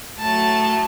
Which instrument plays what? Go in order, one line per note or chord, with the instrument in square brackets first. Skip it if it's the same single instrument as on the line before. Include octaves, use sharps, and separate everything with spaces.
[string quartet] A2 F#3 A3 A5